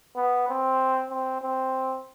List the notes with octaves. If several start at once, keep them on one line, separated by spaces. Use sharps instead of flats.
B3
C4
C4
C4